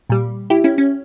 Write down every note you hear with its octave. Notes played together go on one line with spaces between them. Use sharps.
A#2 G3
E4 G4
C#4 E4
C#4